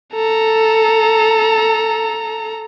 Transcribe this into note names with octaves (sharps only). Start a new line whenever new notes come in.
A4 A#5